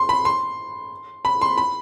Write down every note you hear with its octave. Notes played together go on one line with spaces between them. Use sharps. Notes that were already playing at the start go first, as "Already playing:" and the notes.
Already playing: C6
B5
C6
B5
C6
B5